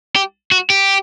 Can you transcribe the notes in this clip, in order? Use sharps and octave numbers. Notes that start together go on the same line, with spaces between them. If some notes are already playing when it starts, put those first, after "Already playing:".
G4
F#4
G4